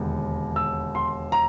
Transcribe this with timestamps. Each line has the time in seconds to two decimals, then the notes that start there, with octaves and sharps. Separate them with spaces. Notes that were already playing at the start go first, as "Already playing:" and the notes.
Already playing: E1 D#2 D3
0.56 E6
0.95 C6
1.32 A#5